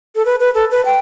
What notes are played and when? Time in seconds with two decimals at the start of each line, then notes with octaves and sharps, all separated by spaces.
0.15 A4
0.25 B4
0.40 B4
0.55 A4
0.71 B4
0.85 G5